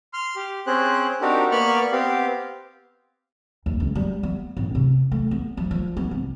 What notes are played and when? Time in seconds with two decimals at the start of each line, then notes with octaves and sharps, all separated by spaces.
0.13 C6 F6
0.36 G4
0.67 C4 C#4 G#4 C5 F#6
1.21 C4 D4 D#4 F#4 G4 A#4
1.51 A#3 B3 D5 B5 C#6 F6
1.92 B3 C4 G4 F5
3.66 D#2
3.80 C#2
3.95 G3
4.23 B3
4.57 A1
4.75 C3
5.12 A3
5.31 B3
5.57 F3
5.71 F3
5.97 B3
6.11 C2